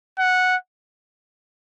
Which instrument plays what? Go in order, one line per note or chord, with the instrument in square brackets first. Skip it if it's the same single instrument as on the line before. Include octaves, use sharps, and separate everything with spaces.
[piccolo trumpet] F#5